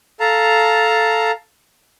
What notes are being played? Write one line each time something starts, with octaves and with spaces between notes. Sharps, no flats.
A4 F5 A5 A#5